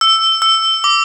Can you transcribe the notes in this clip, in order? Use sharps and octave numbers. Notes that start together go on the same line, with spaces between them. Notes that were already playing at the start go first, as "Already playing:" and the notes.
E6
E6
D6